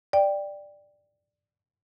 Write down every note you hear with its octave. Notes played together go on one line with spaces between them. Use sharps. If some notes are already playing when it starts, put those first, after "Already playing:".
D5 G5